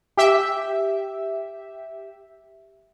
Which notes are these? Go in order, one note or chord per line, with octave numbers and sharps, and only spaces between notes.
G4 E5